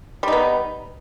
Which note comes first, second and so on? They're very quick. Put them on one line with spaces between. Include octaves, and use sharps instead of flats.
G3 D#4 B3